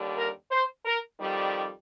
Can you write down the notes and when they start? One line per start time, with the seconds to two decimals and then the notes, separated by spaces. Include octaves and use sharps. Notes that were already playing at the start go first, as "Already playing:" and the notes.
Already playing: D#2 D3 G3
0.15 A#4
0.51 C5
0.86 A#4
1.20 F2 D#3 G3